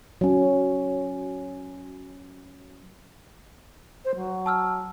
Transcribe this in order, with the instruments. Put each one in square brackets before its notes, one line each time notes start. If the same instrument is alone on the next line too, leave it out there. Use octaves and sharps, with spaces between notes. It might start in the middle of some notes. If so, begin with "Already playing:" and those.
[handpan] F#3 C#4
[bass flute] C5
F#3
[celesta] A5 E6 F6